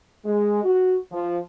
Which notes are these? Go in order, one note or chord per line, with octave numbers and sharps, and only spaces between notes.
G#3
F#4
F3